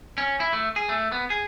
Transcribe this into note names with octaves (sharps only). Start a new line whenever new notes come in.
C#4
E4
A3
G#4
A3
B3
G#4